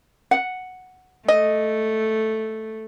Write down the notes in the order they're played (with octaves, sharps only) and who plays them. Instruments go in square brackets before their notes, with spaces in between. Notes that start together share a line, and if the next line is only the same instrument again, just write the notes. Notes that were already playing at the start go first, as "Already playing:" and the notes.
[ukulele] F#5
[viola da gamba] A3 [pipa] D#5